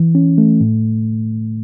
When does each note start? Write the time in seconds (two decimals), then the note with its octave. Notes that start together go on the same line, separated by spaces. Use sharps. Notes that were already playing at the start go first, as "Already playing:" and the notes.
Already playing: E3
0.15 C#4
0.38 A3
0.61 A2